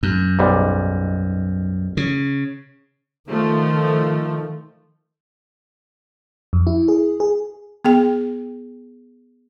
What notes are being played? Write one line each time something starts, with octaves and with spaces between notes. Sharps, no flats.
F#2
B1 G#2 G3
C#3
D#3 F3 A3
F2
E4
G#4
G#4
B3 G#4 G5